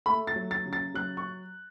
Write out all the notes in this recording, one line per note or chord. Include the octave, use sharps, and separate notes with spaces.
A3 B5
A6
F#3
A6
C#3
A6
F#3 F#6
C#6